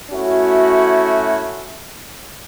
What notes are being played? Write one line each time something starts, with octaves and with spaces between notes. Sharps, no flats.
A3 C#4 E4 F#4